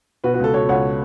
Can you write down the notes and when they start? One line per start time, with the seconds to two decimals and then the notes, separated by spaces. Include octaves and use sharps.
0.24 B2 F#4 B4
0.34 F#4 B4
0.40 C#2 A4
0.54 B2 A4 C#5
0.69 C#2 C#5 F#5